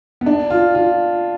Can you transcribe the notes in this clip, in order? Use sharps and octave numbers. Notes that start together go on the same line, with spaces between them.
B3
D4
F4
F4